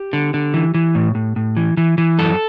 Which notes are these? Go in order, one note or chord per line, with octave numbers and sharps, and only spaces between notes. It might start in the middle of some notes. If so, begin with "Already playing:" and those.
Already playing: G4
D3
D3
E3
E3
A2
A2
A2
E3
E3
E3
F#2 A4